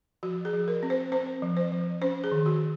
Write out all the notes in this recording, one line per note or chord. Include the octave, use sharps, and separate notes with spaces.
F3 F#4
G#4
F3
A#4
C4
C5
C4 C5
F3
C5
F3
C#4 C5
G#4
D#3
F#4